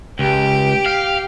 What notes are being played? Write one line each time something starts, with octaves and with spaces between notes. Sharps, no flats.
C#2 G4
F5